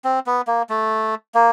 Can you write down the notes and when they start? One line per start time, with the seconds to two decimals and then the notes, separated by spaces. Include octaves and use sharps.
0.04 C4
0.26 B3
0.47 A#3
0.69 A3
1.35 A#3